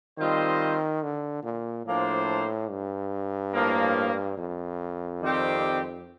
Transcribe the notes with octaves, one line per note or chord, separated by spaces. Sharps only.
D#3 G3 C4 F4 C5 D#5
D3
A#2
A2 F3 A#3 D4 A4 C5
G2
A2 F3 A#3
F2
D#3 G3 C4 G4